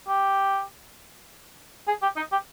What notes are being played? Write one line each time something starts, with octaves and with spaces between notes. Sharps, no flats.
G4
G#4
G4
D#4
G4